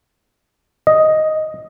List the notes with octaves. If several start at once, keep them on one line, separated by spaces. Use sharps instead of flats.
D#5